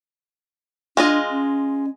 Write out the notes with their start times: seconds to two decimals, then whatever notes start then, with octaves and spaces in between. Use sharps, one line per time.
0.97 G#3 D4 F4 D#5
1.30 C#4